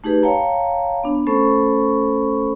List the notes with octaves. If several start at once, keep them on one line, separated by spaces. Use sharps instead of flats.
A3 D#4 G4 G#4 B4
C#5 F5 G5 A5 A#5
B3 D4
A3 C#4 A4 C5 B5 C#6